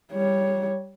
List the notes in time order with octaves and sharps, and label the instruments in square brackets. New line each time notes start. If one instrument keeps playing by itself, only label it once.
[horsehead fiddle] G3 C#5